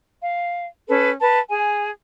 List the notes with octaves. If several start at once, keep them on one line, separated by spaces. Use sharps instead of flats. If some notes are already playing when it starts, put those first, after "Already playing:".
F5
C#4 A4 B4
B4 A5
G#4 G#5